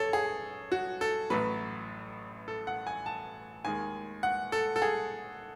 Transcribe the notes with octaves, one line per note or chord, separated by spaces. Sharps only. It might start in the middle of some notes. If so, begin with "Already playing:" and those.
Already playing: G#1 F#2 A4 C#5
G#4
F#4
A4
A1 A2 F#3 B4
A4
F#5
G#5
A5
D#2 D#3 G#3 G#5
F#5
A4
A4
G#4